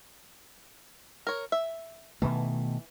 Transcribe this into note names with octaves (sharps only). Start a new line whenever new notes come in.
A#4 C#5
E5
B2 D#3 E3 A3